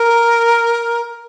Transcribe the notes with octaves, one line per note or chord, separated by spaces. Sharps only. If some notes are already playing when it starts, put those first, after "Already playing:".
Already playing: A#4